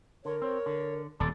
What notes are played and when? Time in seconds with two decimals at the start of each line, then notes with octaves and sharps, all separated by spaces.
0.25 D3 A#4 C#5
0.42 C4 C#5
0.66 D3
1.20 D#1 A2 D3 A4 D5